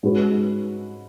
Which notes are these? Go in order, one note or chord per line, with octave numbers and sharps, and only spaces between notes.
G#2 G#3 C#4 F#4 B4